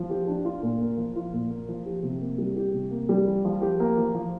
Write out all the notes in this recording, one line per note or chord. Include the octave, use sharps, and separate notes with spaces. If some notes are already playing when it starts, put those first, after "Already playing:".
Already playing: F3
G4
D4
F4
A#2
A#3
F3
F4
A#2
A#3
F3
G4
C3
A#3
G3
G4
C3
A#3
G3
F3
F3
G4
A#3
F3
F3